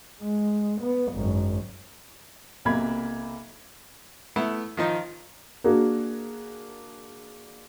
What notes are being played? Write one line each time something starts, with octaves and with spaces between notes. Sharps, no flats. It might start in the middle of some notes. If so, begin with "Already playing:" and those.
G#3
B3
G#1 F#2
B1 C3 A#3 B5 G#6
A3 B3 E4
D#3 F3 D#4
A#3 D4 F#4 G#4 A#4